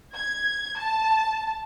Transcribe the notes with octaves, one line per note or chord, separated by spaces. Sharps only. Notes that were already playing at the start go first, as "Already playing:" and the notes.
G#6
A5